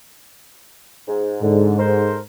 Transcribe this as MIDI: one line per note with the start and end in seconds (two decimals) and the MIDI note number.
1.07 1.38 44
1.42 2.22 44
1.42 1.78 50
1.79 2.16 69
1.79 2.16 70
1.79 2.16 72